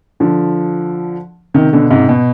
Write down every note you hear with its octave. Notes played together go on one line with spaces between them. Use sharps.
D3 F3
C3 D#3
B2 D3
G#2 C3
B2